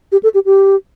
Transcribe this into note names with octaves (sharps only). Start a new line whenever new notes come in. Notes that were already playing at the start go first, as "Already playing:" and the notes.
G4
A4
G4
G4